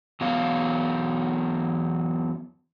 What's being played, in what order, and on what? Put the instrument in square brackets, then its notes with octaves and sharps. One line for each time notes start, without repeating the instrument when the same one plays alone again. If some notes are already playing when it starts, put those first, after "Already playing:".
[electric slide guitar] E2 F#3 B3 F5